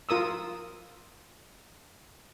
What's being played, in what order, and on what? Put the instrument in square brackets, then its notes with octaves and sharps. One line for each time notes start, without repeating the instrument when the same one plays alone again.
[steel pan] F4 A#4 D#6 E6